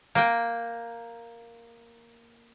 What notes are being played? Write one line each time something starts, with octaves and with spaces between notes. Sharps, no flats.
A#3 G5